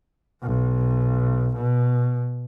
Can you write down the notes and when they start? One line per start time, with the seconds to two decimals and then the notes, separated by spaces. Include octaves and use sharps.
0.42 B1
1.56 B2